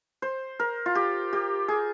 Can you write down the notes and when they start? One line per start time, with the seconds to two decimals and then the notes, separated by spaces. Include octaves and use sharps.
0.22 C5
0.60 A#4
0.86 F4
0.95 G4
1.33 G4
1.68 G#4